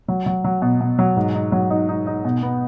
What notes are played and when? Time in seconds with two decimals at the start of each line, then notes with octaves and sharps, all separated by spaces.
0.08 F#3
0.26 F#3
0.44 F#3
0.62 B2
0.81 B2
0.99 F#3
1.16 G#2
1.35 D#4
1.52 F#3
1.70 D#4
1.89 D#4
2.07 D#4
2.25 B2
2.42 B3